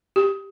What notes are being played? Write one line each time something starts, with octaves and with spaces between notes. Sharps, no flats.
G4